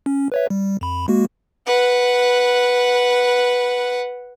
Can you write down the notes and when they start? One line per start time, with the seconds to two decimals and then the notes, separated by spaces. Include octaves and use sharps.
0.06 C#4
0.32 B4 C#5 E5
0.50 G3
0.81 F2 B5
1.08 G#3 A#3 F#4
1.67 B4 F#5